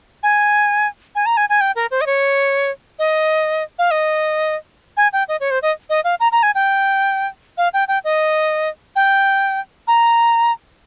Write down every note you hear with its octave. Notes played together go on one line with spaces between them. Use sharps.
G#5
G#5
A#5
G#5
G#5
G5
A#4
C5
D#5
C#5
D#5
F5
D#5
G#5
G5
D#5
C#5
C5
D#5
D#5
F5
A#5
A#5
G#5
G5
F5
G5
G5
D#5
G5
A#5